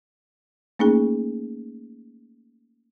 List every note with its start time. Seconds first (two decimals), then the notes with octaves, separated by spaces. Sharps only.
0.79 A3 A#3 C#4 D#4 G#4